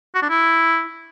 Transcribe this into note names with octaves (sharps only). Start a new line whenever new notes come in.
F#4
D4
E4